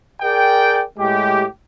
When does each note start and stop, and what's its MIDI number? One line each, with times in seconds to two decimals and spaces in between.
0.21 0.82 68
0.21 0.82 70
0.21 0.82 74
0.21 0.82 79
0.98 1.45 45
0.98 1.45 56
0.98 1.45 67